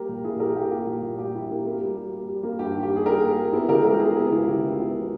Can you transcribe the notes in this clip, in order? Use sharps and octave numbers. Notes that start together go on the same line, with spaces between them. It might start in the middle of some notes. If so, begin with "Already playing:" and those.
Already playing: G3 A#3 G4 A#4
A#2
A#2 E4 G#4
E4 G4 A#4
A#3 G4
A#3 G4
A#2
A#2
G3 G4
E4
A#3
A#3
G3
G3
G3
G3
A#3
G2 G4
D#3
G4
G3
G#4
G3 G4 A#4
A#3
G3
B3 E4 G#4
C#3 G4 A#4
G#3 G4 A#4
B3 E4 G#4
B3 E4
C#2 E4
C#3 G4
C#2
B3